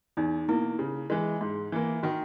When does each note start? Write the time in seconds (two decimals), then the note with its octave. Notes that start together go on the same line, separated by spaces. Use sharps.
0.17 E2 D#4
0.48 B2 A#3 E4
0.79 C#3
1.10 E3 G#3
1.41 G#2
1.72 E3 A#3
2.03 D#3 F#4